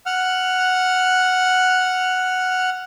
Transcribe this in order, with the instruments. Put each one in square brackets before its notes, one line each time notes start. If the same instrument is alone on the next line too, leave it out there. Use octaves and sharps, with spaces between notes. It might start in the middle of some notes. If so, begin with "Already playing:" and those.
[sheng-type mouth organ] F#5 F6